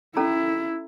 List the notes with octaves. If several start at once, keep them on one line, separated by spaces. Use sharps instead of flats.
C#4 E4 A4 A#5